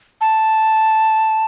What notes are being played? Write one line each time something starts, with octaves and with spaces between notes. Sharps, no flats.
A5